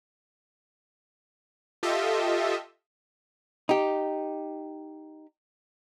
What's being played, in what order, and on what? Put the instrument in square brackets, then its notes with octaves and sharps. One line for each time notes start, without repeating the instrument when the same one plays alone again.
[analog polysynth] F4 G4 A4 D#5 E5
[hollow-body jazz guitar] D#4 G4